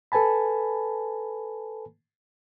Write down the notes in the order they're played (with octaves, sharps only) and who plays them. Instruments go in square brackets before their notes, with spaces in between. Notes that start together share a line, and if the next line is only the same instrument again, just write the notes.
[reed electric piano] A4 B4 G#5 A5 B5